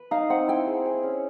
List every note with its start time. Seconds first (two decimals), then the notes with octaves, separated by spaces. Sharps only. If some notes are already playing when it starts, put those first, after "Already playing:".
Already playing: B4
0.11 D#4 F5
0.30 C4 F#5
0.48 E4 G5
0.67 G#4
0.86 G#4
1.03 C#4